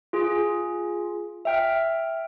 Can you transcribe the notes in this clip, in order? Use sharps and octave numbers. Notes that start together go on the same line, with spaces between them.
F4 G#4
E5 G5 F6